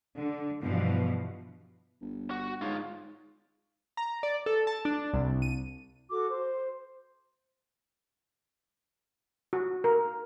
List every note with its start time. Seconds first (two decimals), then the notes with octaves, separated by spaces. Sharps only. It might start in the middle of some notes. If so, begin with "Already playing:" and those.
0.16 D3
0.62 G2 B2 E3 F3
2.01 G1
2.31 F#4
2.62 G#2 F4 C#5
3.97 A#5
4.23 D5
4.46 A4
4.67 A5
4.85 D4
5.13 C2
5.42 D#7
6.11 F#4 A4 D6
6.30 C5
9.53 F#4
9.84 A#4